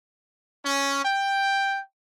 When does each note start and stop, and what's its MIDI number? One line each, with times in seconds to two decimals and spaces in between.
0.65 1.02 61
1.05 1.81 79